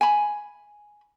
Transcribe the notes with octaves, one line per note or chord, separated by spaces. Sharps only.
G#5 B5